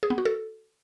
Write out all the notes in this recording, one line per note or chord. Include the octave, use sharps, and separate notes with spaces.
G#4
B3
F#4
A4